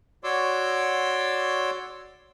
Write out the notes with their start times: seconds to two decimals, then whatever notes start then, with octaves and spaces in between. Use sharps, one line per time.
0.24 F#4 C#5 D5 C6 D6 E6